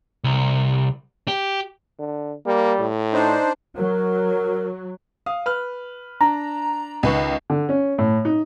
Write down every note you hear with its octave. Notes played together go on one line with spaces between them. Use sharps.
C2
G4
D3
G3 A#3
A2
D4 D#4 C5
F#3 A#4
F5 D#6
B4 F6
D4 A#5
C#2 D#3 B4 C#6
D3
C#4
A2
D#4